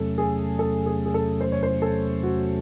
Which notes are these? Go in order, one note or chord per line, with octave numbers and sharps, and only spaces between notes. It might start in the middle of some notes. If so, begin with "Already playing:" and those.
Already playing: E2 C3 F#3 A3 C#4 A4
G#4
A4
G#4
G#4
A4
C5
C#5
C5
A4
F#4